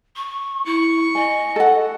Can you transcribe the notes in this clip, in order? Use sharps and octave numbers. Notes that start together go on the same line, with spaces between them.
C#6
E4 C#6
D#5 G#5
A4 F#5